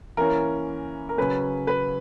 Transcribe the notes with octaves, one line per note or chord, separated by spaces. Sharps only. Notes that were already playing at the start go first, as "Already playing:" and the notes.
E3 A#3 C#4 A#4
A#4
C#3 F#3 C#4 B4
B4